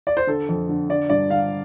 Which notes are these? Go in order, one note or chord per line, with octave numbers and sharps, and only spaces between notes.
D5
C5
D3 A4
F2
D3
D3 D5
G2 D5
D3 F5